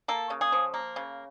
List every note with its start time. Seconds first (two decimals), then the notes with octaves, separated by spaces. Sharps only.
0.08 A#3 A4
0.30 C#3
0.41 G#4
0.52 F3
0.74 A#3
0.96 C#3